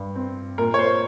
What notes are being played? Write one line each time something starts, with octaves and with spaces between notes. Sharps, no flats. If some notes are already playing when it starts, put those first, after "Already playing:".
Already playing: G2
C4
A#2 A#4
C#5
C5